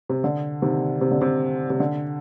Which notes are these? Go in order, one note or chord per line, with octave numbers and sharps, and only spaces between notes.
C3
D3
C3 D#3
C3
D3
C3
C3
D3